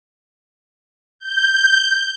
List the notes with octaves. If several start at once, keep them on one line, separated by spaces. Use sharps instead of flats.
G6